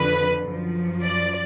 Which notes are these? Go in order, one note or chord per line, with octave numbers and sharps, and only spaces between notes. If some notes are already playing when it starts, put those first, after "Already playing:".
Already playing: F2 D3 F3 B4
F#2 F3
D5